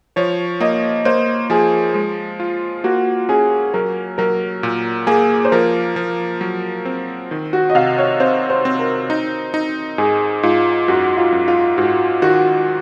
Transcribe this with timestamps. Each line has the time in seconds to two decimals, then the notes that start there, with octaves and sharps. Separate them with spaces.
0.16 F3 C#5
0.60 A#3 D#5
1.05 A#3 C5
1.50 F3 G#4
1.94 G#3
2.40 F4
2.84 A#3 F#4
3.29 C#4 G#4
3.74 F#3 A#4
4.18 F#3 A#4
4.63 A#2
5.07 A#3 G#4
5.45 C5
5.52 F3 A#4
5.96 F3
6.41 F#3
6.85 C4
7.31 D#3
7.53 F#4
7.70 D#5
7.75 C3 F5
7.98 C#5
8.20 C4 C5
8.50 C5
8.65 C4
8.79 A#4
9.10 D#4
9.54 D#4
9.98 G#2 G#4
10.43 G#2 F4
10.88 F#2 F#4
11.17 F4
11.32 F#2
11.48 F4
11.77 G#2 F#4
12.22 D#3 F#4